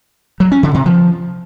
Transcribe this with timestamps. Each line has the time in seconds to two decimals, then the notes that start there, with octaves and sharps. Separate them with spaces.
0.40 F#3
0.52 C#4
0.63 D3
0.74 C3
0.86 F3